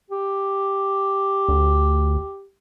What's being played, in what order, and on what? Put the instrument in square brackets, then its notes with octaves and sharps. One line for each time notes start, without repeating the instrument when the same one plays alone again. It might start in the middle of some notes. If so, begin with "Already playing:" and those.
[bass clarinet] G4
[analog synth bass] D2